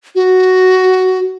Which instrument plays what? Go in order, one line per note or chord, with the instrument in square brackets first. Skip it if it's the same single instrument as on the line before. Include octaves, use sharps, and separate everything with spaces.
[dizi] F#4